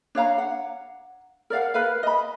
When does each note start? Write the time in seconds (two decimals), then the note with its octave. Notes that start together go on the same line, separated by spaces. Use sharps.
0.15 D4 C#5 F5 A#5
0.38 F#5
1.50 A#4 D5 F5 F#5
1.74 A#4 B4 F5
2.03 D#5 B5